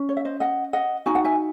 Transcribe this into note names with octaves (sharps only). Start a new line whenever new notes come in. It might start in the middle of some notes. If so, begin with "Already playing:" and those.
Already playing: C#4
C#5
E5
C5 D#5
D#5 F#5
D#5 F#5
D#4 F#4 G#5
F#5
E5 G#5